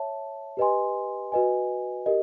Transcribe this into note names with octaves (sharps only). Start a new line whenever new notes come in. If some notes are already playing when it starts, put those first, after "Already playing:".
Already playing: C#5 E5 A5
G4 B4 D#5 G#5 C6
F#4 B4 D#5 G#5
G4 A#4 D#5